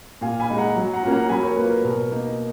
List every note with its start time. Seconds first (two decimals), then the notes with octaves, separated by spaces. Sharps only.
0.21 A#2 F5 G#5
0.40 G#5 B5
0.49 G#3 D#4
0.58 F#5 A#5
0.76 F#3
0.93 F#5 A#5
1.03 A#3 C#4 F4
1.12 F#5 A#5
1.29 F#3 G#5 B5
1.43 A#4 C#5
1.56 A#3 F4 B4
1.71 A#4
1.84 B2 A#4
2.11 A#3 D#4